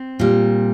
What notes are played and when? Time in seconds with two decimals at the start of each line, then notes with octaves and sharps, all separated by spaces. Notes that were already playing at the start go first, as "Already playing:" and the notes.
Already playing: C4
0.19 A#2 G3